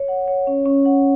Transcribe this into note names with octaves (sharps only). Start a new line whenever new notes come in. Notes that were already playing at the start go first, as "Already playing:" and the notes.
Already playing: C#5
F#5
C#5
C#4
C#4
F#5